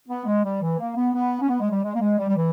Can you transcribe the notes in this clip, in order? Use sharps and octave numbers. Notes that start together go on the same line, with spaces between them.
B3
G#3
G3
E3
A#3
B3
B3
C#4
B3
G#3
G3
G#3
A#3
G#3
G3
G3
E3